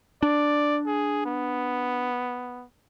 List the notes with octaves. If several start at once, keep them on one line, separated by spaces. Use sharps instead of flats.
D4 D5
G#4
B3